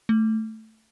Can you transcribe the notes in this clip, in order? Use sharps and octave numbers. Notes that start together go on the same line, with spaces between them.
A3